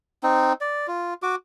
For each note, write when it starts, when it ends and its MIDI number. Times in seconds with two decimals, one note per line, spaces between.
0.23 0.53 60
0.23 0.53 63
0.61 0.87 74
0.88 1.14 65
1.23 1.35 66
1.23 1.35 86